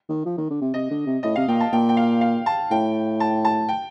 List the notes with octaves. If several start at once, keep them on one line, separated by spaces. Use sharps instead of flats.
D#3
F3
D#3
D3
C3
C3 D#5
D3
C3
A2 D#5
C3 F5
A#2 G5
A5
A#2 G5
G5
F5
F5
A5
A2 G5
A5
A5
G5